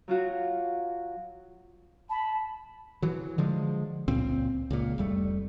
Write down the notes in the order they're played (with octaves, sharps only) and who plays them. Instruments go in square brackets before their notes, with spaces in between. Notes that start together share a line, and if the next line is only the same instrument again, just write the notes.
[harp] F#3 F4 F#4
[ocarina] A5 [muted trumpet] B5
[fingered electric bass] E3 F#3
D3 F3 G#3
C#2 A#2 C4
C#2 A#2
F1 G3 A3